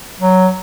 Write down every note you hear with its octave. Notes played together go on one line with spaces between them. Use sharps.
F#3